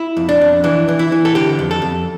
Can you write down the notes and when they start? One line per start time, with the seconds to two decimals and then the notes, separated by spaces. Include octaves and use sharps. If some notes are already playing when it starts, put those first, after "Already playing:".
Already playing: E4
0.17 F2
0.29 D4
0.41 F2
0.64 E3 D4
0.89 E3
0.99 E4
1.12 E3
1.25 A4
1.35 D3 G4
1.59 F2
1.71 A4
1.82 F2